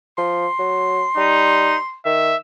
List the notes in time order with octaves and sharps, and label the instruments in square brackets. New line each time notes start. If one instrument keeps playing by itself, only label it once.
[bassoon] F3 [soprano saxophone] C6
[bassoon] F#3
[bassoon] G3 [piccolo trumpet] D#4
[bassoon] D#3 [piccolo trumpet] E5